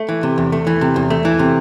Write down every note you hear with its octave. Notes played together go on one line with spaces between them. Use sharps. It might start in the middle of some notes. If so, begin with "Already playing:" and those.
Already playing: A3
E3
C3
E2
A3
E3
C3
E2
A3
E3
C3